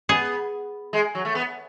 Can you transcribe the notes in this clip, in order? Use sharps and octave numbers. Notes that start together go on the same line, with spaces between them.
B3 G#4
G#3
F#3
A3
B3